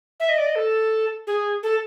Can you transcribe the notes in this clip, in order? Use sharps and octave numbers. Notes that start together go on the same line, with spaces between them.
E5
D#5
D5
D#5
A4
G#4
A4